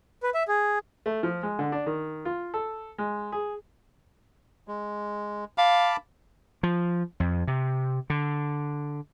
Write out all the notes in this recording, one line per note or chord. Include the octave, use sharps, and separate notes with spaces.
B4
E5
G#4
A3
F3
G#3
D3
D4
D#3
F4
A4
G#3
G#4
G#3
F5 A5 B5 D6
F3
F2
C3
D3